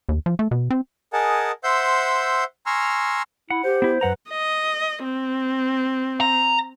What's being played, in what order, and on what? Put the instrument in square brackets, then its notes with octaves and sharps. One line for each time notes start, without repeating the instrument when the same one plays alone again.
[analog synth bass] D#2
F3
A3
B2
C4
[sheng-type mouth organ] G#4 A#4 D#5 F#5 G#5 A5
C5 E5 F#5 C6 E6 G6
G#5 A#5 C6 C#6 E6 F6
[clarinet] E4 [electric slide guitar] F#5
[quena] G4 [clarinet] C5
[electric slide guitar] B3 E4
[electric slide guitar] F#2 F#5 A#5 [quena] B4
[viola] D#5
C4
[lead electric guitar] A#5